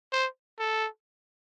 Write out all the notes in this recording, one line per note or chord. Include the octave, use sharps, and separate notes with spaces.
C5
A4